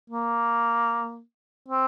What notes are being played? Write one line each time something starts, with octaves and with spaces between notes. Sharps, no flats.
A#3
C4